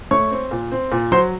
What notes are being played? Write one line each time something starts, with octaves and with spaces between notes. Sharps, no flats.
A3 C#5 C#6
C4
A#2
C4
A#2
F#3 C5 C6